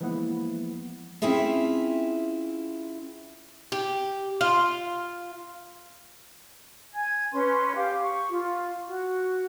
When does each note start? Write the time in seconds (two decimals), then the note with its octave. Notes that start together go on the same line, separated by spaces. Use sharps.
0.01 E3 F3 G#3 A#3 B3 E4
1.22 C4 C#4 E4 F4 G#4 E5
3.72 G4
4.41 F4
6.94 G#5 G#6
7.33 C#4 B4 C6
7.75 G4 F5 D6
8.03 C#6
8.29 F4
8.88 F#4